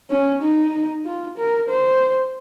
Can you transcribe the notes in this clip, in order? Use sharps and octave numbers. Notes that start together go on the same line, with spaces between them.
C#4
D#4
F4
A#4
C5